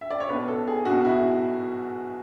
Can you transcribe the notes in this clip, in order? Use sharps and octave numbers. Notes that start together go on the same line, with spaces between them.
E5
D5
C#5
B1 B2 B4
A4
G#4
B1 B2 F#4
E4